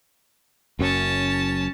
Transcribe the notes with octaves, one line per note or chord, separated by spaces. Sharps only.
F#1 F#2 C#4 A5